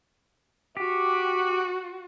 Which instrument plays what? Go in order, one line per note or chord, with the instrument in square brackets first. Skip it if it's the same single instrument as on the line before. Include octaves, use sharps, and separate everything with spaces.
[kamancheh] F#4 [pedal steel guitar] G4